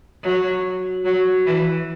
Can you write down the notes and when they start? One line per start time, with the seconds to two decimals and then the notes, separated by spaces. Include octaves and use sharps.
0.23 F#3
1.05 F#3
1.45 E3